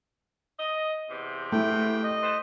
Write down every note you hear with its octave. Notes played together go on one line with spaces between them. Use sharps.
D#5
E2 C3
A3 E4 G5
D#5
A4 B4 C5